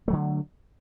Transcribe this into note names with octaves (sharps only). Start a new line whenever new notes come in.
D3 F#3 A3